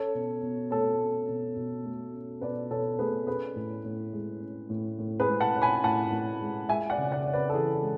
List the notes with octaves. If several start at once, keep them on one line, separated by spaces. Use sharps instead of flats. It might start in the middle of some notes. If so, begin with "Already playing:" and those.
Already playing: C#4 A4 C#5
B2
B2
A3 A4 C#5
C#4
B2
B2
A3
C#4
B2 B4 D5
B2 A4 C#5
A3 G#4 B4
C#4 G#4 B4
A2
A2
G#3
C#4
A2
A2
G#4 B4
G#3
F#5 A5
C#4
G#5 B5
A2 F#5 A5
A2
G#3
G#3 E5 G#5
D5 F#5
C#3
D5 F#5
C#4
B4 D5
A4
E3 G#4
G#3